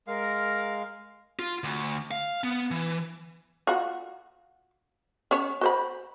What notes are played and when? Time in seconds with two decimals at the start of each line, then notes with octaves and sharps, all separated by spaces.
0.07 G#3 A#4 F5
1.39 F4
1.64 D2
2.11 F5
2.44 B3
2.71 E3
3.67 F4 F#4
5.31 C#4 C#5
5.61 F#4 C5 B5